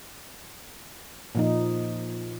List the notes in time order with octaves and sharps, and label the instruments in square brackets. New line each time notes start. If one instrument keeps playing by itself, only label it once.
[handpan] A#2 F3 D#4